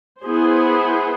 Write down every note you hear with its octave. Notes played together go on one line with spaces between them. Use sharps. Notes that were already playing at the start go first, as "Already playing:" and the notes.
B3 E4 G#4 C5